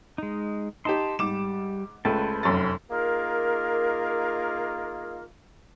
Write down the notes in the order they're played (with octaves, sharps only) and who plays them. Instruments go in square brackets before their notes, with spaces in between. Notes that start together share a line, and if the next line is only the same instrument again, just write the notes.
[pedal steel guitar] G#3 D#4
[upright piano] D#4 G4 [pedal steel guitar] A5 C6
[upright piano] G#2 D6 E7 [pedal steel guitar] G3
[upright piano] C#2 A3 [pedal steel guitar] B4 C5 A5
[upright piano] F1 F#2 A6
[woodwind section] A#3 D#4 F4 G#4 A#4